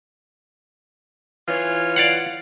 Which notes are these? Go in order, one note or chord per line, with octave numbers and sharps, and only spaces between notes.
E3 F4 C#5
D5 F5 F#5